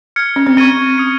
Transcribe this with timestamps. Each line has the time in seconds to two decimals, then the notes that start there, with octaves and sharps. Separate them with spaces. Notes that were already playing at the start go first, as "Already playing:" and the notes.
0.16 F6 G#6 C#7
0.36 C#4
0.46 C4
0.57 C4 C#6 G#6 D#7 G7
0.98 D#6 G#6 C#7